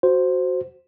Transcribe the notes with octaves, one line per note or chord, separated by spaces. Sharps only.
F#4 C5